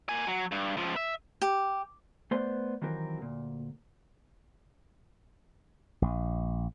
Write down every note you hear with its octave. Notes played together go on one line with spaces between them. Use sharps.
A#3 G#5
F#3
G2
C#2 F3
E5
G4
A3 B3 B4 C5 D5 C6
D#3 E3 F#3 C4 G4 A#4
D2 A#2
A#1